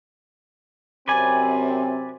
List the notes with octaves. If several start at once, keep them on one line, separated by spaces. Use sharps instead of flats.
F#2 C3 C4 B4 D5 G#5